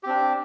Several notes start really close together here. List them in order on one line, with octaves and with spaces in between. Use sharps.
G4 C4 D4